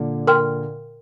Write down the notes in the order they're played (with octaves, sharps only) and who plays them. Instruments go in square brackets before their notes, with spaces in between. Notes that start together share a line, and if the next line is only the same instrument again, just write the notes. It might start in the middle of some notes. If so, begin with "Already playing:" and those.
Already playing: [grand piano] A#2 D3
[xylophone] A#4 G5 C6 F6